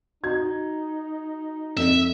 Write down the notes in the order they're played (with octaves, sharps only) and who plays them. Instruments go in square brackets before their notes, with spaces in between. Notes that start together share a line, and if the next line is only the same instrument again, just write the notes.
[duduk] D#4 [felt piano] F#4 G#6
[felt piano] F2 A4 [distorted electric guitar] E5